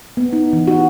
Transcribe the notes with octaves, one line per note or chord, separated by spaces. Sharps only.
B3
D#4
E3
F#4